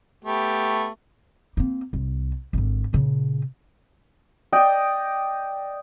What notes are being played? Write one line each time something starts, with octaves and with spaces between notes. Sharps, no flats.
A3 B3 G4
A#3 C4
C2
G#1 D3
A#2 C#3
D5 D#5 G5